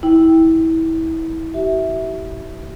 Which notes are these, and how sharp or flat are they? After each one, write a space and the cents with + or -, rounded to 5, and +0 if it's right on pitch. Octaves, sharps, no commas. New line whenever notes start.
E4 -25 G5 +0
G4 -45 E5 -10